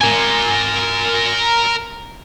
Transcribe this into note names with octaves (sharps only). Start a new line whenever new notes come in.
A#4 G#5